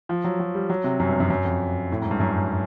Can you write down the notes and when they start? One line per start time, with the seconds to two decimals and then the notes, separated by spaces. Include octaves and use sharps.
0.09 F3
0.24 F#3
0.40 F#3
0.54 G3
0.70 F#3
0.84 C3
1.00 F#2
1.09 G2
1.20 F#2
1.30 F#2
1.45 F2
1.92 A2
2.02 G#2
2.11 G2
2.20 F#2